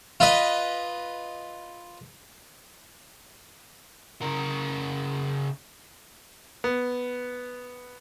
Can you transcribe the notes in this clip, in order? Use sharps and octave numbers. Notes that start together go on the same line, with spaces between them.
F4 B4 D#5
C#3 A#4
B3